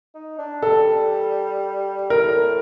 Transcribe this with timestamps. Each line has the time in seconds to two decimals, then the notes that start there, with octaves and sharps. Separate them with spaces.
0.14 D#4
0.38 D4
0.63 G3 A4
2.10 A2 A#4